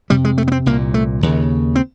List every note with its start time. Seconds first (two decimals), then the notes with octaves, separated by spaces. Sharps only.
0.10 F2 C3 G3
0.25 G#3
0.38 A3
0.48 B3
0.52 C4
0.66 C2 A#2 A#3
0.94 A3
1.23 D#2 C#3
1.76 C4